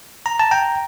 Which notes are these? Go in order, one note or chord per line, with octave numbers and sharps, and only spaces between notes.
A#5
A5
G5 A#5